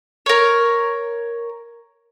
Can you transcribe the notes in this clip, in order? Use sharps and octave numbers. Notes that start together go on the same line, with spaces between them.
A#4 C#5